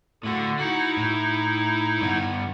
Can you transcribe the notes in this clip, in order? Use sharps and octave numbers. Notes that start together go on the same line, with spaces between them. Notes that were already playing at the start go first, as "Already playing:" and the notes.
A2 D3 F#4
D#4 E4 F#4
A2
G2 B3